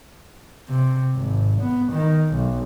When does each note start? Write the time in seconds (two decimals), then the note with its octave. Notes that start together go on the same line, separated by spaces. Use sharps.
0.69 C3
1.15 G#1
1.60 B3
1.92 D#3
2.34 B1